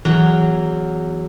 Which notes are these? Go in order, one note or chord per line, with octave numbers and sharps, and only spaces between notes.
E2 F#3 A#5